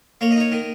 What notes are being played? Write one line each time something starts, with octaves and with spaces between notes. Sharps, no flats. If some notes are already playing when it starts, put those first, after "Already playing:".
A#3 C#5
D#5
D#4 C#5
D#3 D#5